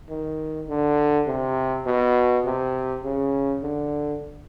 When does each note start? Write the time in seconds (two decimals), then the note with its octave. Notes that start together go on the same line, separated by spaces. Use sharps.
0.10 D#3
0.69 D3
1.27 C3
1.86 B2
2.45 C3
3.04 C#3
3.63 D3